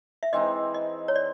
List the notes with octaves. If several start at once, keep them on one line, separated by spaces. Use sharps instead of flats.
E5
E3 G#3 C4 D#4 D#5
D#5
C#5
D5